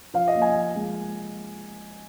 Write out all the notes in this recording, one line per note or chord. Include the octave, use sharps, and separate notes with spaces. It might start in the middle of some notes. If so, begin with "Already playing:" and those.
F3 F5
D#5
A#3
G#5
F3
G#3